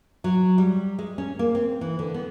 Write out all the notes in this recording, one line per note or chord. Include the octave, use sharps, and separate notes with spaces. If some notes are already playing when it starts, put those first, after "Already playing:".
F#3
G3
G#3
C#4
A#3
C4
E3
D3
B3